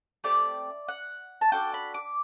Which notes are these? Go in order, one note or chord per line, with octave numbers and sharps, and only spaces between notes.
A3 C4 G4 D5
F#5
A5
D4 F#4 A4 G5
B5
D6